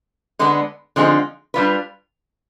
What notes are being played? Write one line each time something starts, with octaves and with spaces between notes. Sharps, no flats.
D3 G#3 B3 D4
D3 F3 G#3 C4 D#4
G3 D4 F4 B4